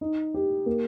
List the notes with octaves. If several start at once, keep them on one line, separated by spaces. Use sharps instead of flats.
D#4
G4
A#3